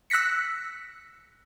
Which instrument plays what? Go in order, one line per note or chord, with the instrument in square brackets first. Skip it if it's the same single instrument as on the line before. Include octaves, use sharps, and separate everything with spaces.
[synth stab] E6 F#6 A#6 B6 C#7